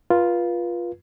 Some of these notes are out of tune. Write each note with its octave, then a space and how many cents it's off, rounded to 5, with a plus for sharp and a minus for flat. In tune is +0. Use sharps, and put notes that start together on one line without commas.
F4 +0 B4 -30